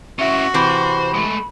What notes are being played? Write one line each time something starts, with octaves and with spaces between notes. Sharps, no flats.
C#4 E4 F#4 E5
C3 E3 C5 B5
G#3 A3